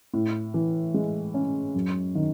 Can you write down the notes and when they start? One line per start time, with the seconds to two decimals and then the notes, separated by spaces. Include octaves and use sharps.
0.14 A2
0.54 E3
0.94 G#3
1.34 C#4
1.74 F#2
2.15 D#3